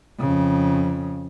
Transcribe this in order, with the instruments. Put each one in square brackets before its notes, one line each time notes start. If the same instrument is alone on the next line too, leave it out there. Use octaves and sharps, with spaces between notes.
[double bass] F2 C#3